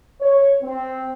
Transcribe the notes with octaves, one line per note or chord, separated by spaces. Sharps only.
C#5
C4